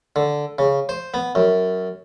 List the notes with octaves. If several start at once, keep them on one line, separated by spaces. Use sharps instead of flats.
D3
C#3
C5
B3
F#2